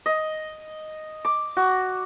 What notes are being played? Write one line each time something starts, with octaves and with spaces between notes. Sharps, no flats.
D#5
D6
F#4